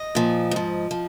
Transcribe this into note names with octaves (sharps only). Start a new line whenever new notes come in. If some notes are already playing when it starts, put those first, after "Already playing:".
Already playing: D#5
A#2 F3
G#2 F3
F3